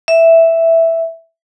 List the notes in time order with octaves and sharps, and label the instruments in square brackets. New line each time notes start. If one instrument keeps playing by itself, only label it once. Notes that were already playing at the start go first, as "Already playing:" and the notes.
[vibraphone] E5